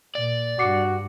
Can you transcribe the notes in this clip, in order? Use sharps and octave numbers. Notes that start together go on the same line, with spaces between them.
A#2 D5
G2 F#4 D6 C7 C#7